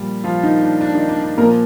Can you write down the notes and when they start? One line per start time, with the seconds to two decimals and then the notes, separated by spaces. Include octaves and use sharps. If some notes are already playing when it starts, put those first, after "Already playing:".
Already playing: A#2 F3 G3
0.24 F3 F4
0.43 D#3 D#4
0.62 D4
0.81 D4
0.95 D#3 D#4
1.09 D4
1.23 D4
1.38 A#2 F3 A#3 A#4